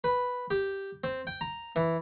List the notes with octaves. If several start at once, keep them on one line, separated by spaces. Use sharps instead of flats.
B4
G4
C4
G5
A#5
E3